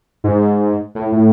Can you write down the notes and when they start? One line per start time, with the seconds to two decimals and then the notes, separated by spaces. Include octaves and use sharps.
0.24 G#2
0.95 A2
1.12 A2